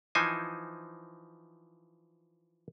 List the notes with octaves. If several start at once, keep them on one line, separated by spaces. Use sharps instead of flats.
E3 F3 D#4 C5 G#5